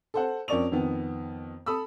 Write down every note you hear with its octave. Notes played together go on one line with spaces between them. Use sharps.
A4 C5 F#5
F2 C#4 A#4 D5 C#6 F7
F2 D#3 B3
A4 B5 D#6 E6